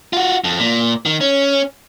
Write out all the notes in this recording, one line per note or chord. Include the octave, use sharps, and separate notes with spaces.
F4 F#4
F2
A#2
D#3
C#4